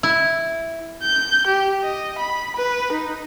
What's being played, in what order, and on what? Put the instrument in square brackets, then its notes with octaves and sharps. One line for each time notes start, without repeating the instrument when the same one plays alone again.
[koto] E4
[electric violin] G6
G4
D#5
B5
B4
D#4